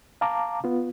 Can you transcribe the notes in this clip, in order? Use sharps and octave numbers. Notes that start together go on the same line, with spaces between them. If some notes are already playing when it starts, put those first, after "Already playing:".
F5 A5 A#5 D6
B3 F4